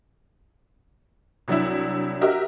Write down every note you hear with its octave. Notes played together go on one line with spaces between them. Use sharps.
C2 F#3 D4 E4
F#4 G4 A#4 D#5 E5